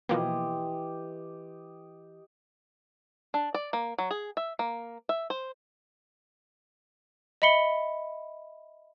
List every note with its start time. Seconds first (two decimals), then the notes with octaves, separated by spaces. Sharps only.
0.09 B2 E3 F3 A#3 G4 D#5 C6
3.34 D4
3.54 D5
3.73 A#3
3.98 F#3
4.11 G#4
4.37 E5
4.59 A#3
5.09 E5
5.30 C5
7.42 D#5 E5 B5 C#7 G7